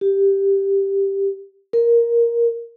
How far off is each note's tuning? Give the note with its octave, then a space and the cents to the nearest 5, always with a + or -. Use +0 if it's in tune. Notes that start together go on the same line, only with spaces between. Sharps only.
G4 +5
A#4 +5